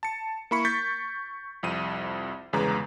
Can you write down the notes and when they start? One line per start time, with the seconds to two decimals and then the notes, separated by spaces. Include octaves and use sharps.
0.03 A5 C#7
0.51 A#3 E4 B5 C#6 C#7
0.65 C#6 G6 A6 B6
1.63 C2 F2 D#7
2.53 G1 E2 C#3 G#3 B4 A#5